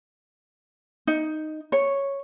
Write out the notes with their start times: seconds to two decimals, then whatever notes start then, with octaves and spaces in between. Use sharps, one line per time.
1.07 D#4
1.72 C#5